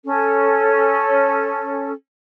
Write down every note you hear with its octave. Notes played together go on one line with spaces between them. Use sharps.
C#4 A4